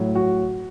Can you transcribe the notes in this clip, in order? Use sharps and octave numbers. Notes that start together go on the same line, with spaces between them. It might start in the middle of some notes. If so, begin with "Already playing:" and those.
Already playing: A2 F#3
F#4